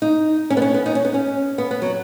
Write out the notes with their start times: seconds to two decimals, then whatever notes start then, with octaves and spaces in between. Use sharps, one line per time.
0.02 D#4
0.50 C#4
0.57 B3
0.62 C#4
0.74 B3
0.86 D#4
0.95 C#4
1.05 B3
1.14 C#4
1.58 B3
1.71 B3
1.82 F#3